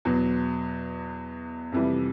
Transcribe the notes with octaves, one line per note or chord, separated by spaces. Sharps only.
E2 B2 F#3
F2 C3 E3 G3